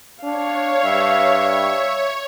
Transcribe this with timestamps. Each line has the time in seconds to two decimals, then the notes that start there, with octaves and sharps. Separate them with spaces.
0.23 D4 C#5 F5
0.85 G2 E5